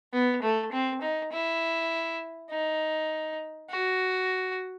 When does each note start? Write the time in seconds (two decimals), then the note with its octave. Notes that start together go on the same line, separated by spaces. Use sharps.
0.13 B3
0.43 A3
0.72 C4
1.02 D#4
1.32 E4
2.51 D#4
3.70 F#4